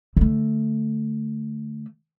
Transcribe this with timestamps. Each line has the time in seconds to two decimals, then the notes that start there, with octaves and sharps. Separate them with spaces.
0.17 D3 A3